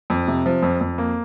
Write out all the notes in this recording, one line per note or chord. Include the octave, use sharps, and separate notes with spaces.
F2
C3
F3
F2
F2
A#3